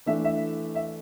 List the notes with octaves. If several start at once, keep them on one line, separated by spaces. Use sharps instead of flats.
E3 A3 D4 E5
E5
E5